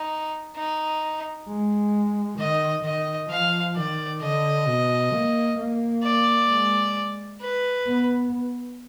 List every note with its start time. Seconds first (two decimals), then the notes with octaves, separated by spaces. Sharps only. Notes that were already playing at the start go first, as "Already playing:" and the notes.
Already playing: D#4
0.56 D#4
1.48 G#3
2.39 D#3 D#5
2.84 D#3 D#5
3.30 F3 F5
3.76 D#3 D5
4.21 D3 D#5
4.67 B2
5.13 A#3
5.58 A#3
6.03 D5
6.49 G#3
7.41 B4
7.87 B3